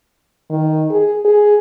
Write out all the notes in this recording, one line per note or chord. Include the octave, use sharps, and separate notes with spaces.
D#3
G#4
G#4